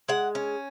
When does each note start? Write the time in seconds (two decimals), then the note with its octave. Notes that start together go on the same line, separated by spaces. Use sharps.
0.09 G#3 F#5
0.35 C#4